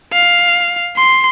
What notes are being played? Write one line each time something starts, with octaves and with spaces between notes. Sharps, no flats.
F5
C6